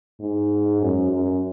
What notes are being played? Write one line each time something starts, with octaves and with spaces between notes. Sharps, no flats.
G#2
F#2
F#2